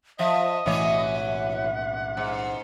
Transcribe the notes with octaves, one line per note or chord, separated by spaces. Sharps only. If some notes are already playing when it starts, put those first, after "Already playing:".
F3 D#5 E5
B1 A2 E3 F#3 A3 C#5 E5
F#5
G#2